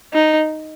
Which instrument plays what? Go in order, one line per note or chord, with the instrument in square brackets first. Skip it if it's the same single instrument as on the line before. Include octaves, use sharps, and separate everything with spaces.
[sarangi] D#4